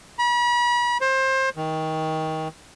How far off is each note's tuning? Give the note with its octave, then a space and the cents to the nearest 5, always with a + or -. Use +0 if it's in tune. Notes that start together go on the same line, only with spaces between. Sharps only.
B5 -40
C5 +25
D#3 +25